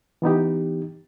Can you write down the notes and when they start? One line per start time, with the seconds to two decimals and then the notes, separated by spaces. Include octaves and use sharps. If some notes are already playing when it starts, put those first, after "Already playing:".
0.22 E3 B3 D#4 G4